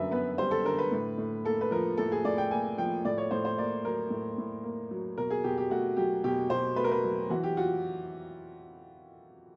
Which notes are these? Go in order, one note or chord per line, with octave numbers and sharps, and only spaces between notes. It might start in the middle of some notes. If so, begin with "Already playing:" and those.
Already playing: F#2 D3 G3 A#4 B4 E5
B3 B4
G3 C5
A4
D3 A#4
B4
A2
A2
A#3 A4
B4
F3 A#4
A2 A4
G#4
A2 D5
G5
A#3 G#5
F3 G5
A2 D5
C#5
A2 C5
C5
A#3 D5
F#3 A#4
A2
A2
A#3
F#3
B2 A#4
G#4
B2 G4
G4
A3 F#4
F#3 G4
B2 G4
B2 C5
A3 B4
A#4
B4
F#3
E3 F#4
G4
F4 F#4